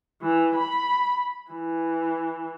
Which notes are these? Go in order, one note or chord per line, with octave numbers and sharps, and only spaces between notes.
E3
B5
E3